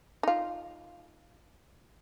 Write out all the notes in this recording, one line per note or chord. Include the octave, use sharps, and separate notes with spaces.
D#4 F4